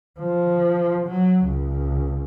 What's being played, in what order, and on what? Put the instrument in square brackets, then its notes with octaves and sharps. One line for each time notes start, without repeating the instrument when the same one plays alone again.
[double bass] F3
F#3
C#2